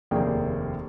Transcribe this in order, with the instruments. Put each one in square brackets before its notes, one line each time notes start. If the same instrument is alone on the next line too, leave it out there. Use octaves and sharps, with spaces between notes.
[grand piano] F1 D#2 A#3 D4 G#4 G5